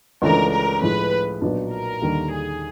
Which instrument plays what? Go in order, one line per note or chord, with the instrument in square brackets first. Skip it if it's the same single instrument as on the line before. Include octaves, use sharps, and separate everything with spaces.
[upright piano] C#2 C#3 E3 A3 D4 [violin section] A#4
[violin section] A#4
[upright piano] A2 F3 G#3 [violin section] B4
[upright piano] B1 A#2 F#3 B3 D4
[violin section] A#4
[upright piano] D#2 D3 G3 A#3
[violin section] G#4